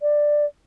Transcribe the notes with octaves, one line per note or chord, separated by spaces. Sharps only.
D5